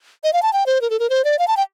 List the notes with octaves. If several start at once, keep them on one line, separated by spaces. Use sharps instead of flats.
D#5
F5
A5
G5
C5
A#4
A4
A#4
C5
D5
F5
A5
G5